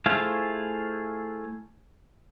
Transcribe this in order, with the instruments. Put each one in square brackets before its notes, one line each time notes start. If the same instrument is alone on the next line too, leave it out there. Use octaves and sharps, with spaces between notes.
[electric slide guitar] A3 E4 F4 G#4 C5 F5